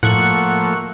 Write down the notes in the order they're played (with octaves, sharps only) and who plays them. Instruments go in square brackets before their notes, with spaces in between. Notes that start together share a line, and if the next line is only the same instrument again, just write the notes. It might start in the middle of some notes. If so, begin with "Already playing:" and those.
[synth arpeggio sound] A2 [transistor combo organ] F3 A3 A#3 [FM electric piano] F#5 C#6 F#6